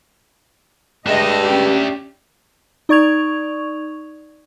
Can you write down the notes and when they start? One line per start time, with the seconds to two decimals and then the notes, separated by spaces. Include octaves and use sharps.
1.06 G2 G#3 D4 D#5 E5
1.43 C#4 G4
2.89 D#4 D5 C#6 G#6 F7